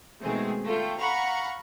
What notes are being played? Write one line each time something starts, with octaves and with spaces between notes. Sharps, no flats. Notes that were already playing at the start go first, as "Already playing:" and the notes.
B2 D#3 G#3 A3 C4 G#4
A3 F4 G5
F5 F#5 A#5 B5 C#6